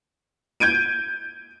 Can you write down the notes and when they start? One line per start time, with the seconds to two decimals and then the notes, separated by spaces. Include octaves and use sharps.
0.60 G6 G#6 D7 D#7